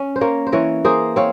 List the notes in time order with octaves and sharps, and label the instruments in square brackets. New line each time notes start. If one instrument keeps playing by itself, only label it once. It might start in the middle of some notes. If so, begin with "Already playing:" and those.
Already playing: [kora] C#4
C5
A#3 A#4 C#5
C5
E3 A#4 C#5
A#3 G#4 C5
C4 C#5 F5